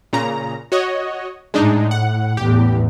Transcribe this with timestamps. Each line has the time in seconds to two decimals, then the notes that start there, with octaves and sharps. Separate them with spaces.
0.13 A#2 C#3 A#5
0.72 F#4 C#5 D#5
1.54 A2 G#3 D4 D#4
1.91 F#5
2.37 A1 E2 A2 G4